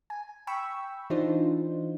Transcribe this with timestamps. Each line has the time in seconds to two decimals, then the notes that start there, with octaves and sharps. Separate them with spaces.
0.10 G#5
0.47 G5 B5 C#6 E6
1.10 E3 D4 D#4 F4 C5